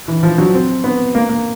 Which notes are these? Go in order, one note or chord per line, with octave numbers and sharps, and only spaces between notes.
E3
F3
F#3
C4
B3
A#3
A#3